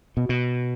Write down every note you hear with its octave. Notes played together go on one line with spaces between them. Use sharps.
B2
B2